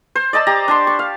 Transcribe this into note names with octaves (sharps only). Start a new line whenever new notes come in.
C5
D5 D#5 A5 E6
G4 A#5
D4 A5 C6
C#6
F5